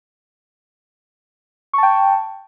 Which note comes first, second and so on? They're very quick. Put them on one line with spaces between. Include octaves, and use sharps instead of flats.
C#6 A5 G5